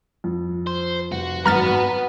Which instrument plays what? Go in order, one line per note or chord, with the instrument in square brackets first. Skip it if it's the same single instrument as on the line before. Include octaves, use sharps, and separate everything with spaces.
[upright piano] F2
[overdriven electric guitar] C5
[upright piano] F1 [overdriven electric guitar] F#4
[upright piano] G#1 F#2 [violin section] B3 [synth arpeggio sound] A#5 F6 A6
[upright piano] A5